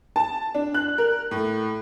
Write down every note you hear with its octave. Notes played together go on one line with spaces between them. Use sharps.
A5
D4
F#6
A#4
A2